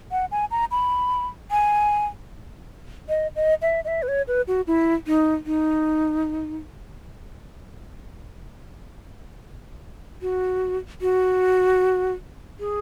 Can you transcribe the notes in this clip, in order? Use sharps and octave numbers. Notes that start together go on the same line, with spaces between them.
F#5
G#5
A#5
B5
G#5
D#5
D#5
E5
D#5
E5
B4
C#5
B4
F#4
E4
D#4
D#4
F#4
F#4
G#4